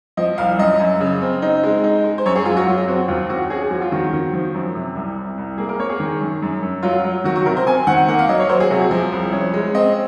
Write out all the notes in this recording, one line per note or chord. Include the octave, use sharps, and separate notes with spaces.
F3 D#5
C2 F5
F#2 D#5
F#2
C#3
C4
D#4
G#3
D#4
G#3
C5
F#2 C#5
G#4
F#2 F4
F#4
F#3 F4
C4 F#4
D#2 F4
D#2 F#4
C#4 G#4
G#4
F3 F#4
F4
D#3 F#4
D#3
F3
F#2
C3
C2
C2
C2
A#3 G#4
A#4
A#3 C#5
G#4
D#3
F#2
F#2
F#2
F#3 F4
F#3
D#3 F#4
F#4
C3 A#4
C5
C4 G#5
D#3 F#5
A#3 F#5
F5
F#3 D#5
C#5
F#3 C5
G#4
C3 F#4
G#4
F3
C2
C#4
G#3
C4 D#5